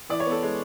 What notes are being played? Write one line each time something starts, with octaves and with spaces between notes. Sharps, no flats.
E3 D5
C#5
B3 A4
G#3